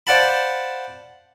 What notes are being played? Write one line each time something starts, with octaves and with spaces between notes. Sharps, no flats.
C5 D5 F5 F#5 A5 B5